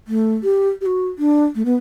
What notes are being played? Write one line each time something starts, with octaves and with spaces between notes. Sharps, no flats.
A3
G4
G4
F#4
D4
A3
B3